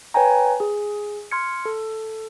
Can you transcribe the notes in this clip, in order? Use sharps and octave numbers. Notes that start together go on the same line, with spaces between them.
B4 C#5 G5 G#5 A#5
G#4
C6 F6 G#6 C#7
A4